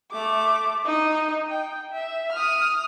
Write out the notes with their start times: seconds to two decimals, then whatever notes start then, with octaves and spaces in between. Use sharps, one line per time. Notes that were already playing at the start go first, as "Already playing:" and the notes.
0.12 A3 D6
0.85 D#4 D#5
1.49 G5
1.92 E5
2.33 D#6 F6